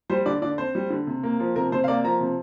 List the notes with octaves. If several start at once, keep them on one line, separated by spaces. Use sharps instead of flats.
G3 C5
D3 D5
D3 D5
C4 C5
G3
D3
C3
A#3
F3
C3 A#4
C3 C5
F5
A#3 D5
F3 A#5
C3